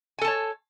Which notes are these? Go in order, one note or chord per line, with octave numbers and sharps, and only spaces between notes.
A4 C#5 G#5 A5